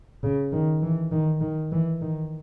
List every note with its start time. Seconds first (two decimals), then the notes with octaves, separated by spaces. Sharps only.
0.23 C#3
0.53 D#3
0.82 E3
1.12 D#3
1.41 D#3
1.72 E3
2.01 D#3